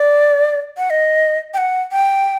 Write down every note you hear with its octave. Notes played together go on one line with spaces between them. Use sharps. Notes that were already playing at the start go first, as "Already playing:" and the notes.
Already playing: D5
F#5
D#5
G5
F#5
G5